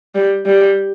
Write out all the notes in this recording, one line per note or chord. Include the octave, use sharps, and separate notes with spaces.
G3
G3